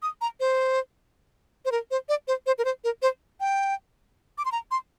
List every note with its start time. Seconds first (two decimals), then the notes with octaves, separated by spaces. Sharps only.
0.02 D#6
0.21 A#5
0.40 C5
1.65 C5
1.72 A#4
1.91 C5
2.09 D5
2.28 C5
2.46 C5
2.58 A#4
2.65 C5
2.84 A#4
3.02 C5
3.40 G5
4.38 D6
4.45 C6
4.52 A#5
4.71 C6